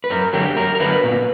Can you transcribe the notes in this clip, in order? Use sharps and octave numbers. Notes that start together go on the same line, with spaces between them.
B4
F#2 A#4
D3 F#3 G4
F#2 A#4
A#4
D3 F#3 B4
A#2